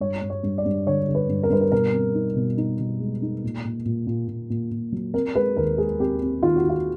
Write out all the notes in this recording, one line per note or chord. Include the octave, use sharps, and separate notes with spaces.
G2 C#5
G2
C#5
G2
D5
G2
D3 C#5
D3
B4
G2
A#4
G2 B4
A#4
B2 A#4
C4
D#4
B2
D#4
B2
G#3
D#4
A#2
A#2
A#2
A#2
A#2
A#2
A#2
F#3
C4 A#4
G#3 B4
D#2 A#4
G#3 G#4
C4 G4
C4
D#3 F4
F#4
D#3
F4